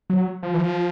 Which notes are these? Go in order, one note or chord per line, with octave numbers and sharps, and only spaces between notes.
F#3
F3
E3
F3